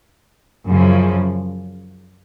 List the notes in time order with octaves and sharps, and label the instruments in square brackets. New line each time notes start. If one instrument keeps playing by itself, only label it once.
[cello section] F#2 C#3 F3